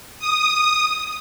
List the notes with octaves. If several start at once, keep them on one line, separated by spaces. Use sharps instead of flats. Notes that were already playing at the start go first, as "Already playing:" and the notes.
D#6